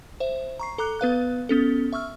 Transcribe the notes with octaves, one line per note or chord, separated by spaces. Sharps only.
C5 E5
A#5 C#6 C7
A4 A#5 D6 F#6
B3 B4 F5 F#6
B3 C#4 A4
E5 C#6 E6 F6